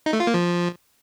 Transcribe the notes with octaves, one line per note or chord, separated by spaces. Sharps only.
D#4
A3
F4
A#3
F3